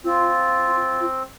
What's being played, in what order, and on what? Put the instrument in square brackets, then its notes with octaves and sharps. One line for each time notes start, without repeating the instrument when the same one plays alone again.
[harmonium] C4 [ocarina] F4